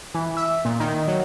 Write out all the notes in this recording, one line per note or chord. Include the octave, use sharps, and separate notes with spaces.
E3
E5
A#2
D#3
F#3